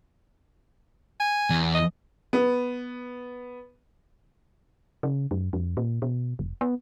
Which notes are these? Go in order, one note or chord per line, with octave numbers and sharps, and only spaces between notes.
G#5
E2
D#5
B3
C#3
F#2
F2
A#2
B2
F1
B3